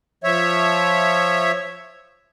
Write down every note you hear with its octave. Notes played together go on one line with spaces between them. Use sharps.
F3 C#5 E5